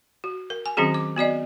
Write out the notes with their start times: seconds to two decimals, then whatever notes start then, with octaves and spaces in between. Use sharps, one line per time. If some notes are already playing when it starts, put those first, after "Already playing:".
0.24 F#4
0.50 A#4
0.66 G#5
0.77 D#3 F#3 C4 C#4 F#4 G#4
0.94 D6
1.16 B3 F#4 D5 D#5